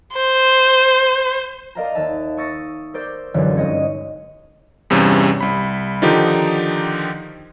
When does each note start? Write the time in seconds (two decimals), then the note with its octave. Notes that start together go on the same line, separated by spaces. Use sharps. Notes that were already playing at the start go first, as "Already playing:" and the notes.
0.15 C5
1.75 A#4 D5 D#5 F5 A5 A#5
1.95 D#2 E5 A5
2.37 C#6 D#6 E6 A6 A#6 C#7
2.94 A#4 C5 D5 E6 G6
3.34 D#1 C2 F#2 D3 E3
3.57 G2 G#3 C#4 D#5 G#6 C#7
4.90 E2 G2 C3 C#4
5.41 C2 B5
6.02 D3 D#3 F3 D#4 G4